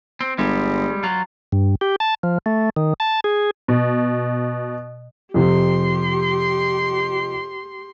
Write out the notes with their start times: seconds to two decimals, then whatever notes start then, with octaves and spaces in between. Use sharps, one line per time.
0.21 C4
0.38 G1 G3 G#3
1.03 F#3 F4
1.52 G2
1.81 G4
2.00 A5
2.23 F3
2.46 A3
2.77 D#3
3.00 A5
3.24 G#4
3.68 B2
5.34 F2 C3 F3 G4 C6